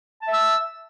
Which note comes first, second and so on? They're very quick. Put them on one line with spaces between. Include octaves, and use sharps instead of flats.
A5 E5 E6